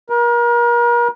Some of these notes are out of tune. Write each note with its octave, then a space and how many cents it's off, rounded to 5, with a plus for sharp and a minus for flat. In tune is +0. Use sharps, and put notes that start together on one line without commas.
A#4 +35